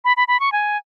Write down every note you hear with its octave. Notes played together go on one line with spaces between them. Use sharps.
B5
B5
B5
C#6
G#5